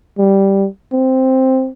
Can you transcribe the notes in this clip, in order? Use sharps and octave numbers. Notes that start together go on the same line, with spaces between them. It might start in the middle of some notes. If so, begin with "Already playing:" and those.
G3
C4